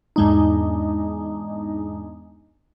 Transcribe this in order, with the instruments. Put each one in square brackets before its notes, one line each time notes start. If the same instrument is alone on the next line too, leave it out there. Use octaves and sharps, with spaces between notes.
[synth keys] E2 G#2 G#3 D4 D#4